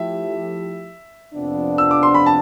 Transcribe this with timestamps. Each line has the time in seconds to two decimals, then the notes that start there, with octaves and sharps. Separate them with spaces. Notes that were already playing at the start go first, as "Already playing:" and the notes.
Already playing: F3 A3 E4 G4 E5
1.33 F2 C3 F3 B3 D4
1.78 E6
1.91 D6
2.03 C6
2.14 B5
2.26 A5